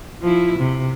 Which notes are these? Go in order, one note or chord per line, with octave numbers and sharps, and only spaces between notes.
F3 E4
C3